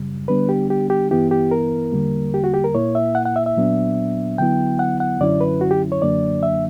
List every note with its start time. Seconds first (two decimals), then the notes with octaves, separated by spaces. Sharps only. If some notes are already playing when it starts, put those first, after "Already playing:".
Already playing: F#2 C#3 G3
0.28 D3 G3 B3 D4 B4
0.49 G4
0.70 G4
0.90 G4
1.11 G2 E3 B3 E4 G4
1.31 G4
1.51 A#4
1.92 E2 D3 G3 A#3
2.34 G4
2.44 F#4
2.54 G4
2.64 A#4
2.74 A#2 A#3 E4 C#5
2.95 E5
3.15 F#5
3.25 F#5
3.36 E5
3.46 E5
3.57 A#2 F#3 B3 D4
4.38 D3 F#3 B3 E4 G5
4.79 F#5
5.00 F#5
5.20 F#2 D3 F#3 C#4 E4 D5
5.41 B4
5.61 F#4
5.71 G4
5.92 C#5
6.02 F#2 D3 F#3 A#3 D4 D5
6.43 E5